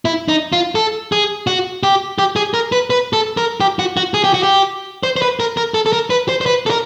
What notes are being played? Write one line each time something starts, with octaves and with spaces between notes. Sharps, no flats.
E4
D#4
F4
A4
G#4
F#4
G4
G4
G#4
A#4
B4
B4
A4
A#4
G4
F#4
F#4
G#4
G4
F#4
G4
C5
C5
B4
A#4
A#4
A4
A4
A#4
B4
C5
C5
B4
A4
A#4